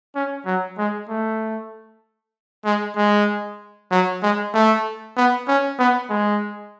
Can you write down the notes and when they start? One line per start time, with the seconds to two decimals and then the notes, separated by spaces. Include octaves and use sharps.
0.15 C#4
0.46 F#3
0.78 G#3
1.09 A3
2.65 G#3
2.96 G#3
3.91 F#3
4.22 G#3
4.54 A3
5.17 B3
5.48 C#4
5.79 B3
6.10 G#3